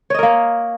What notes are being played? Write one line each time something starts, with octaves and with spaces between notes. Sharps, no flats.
A#3 A#4 C#5 D#5